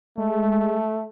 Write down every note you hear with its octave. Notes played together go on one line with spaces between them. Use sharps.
G#3 A3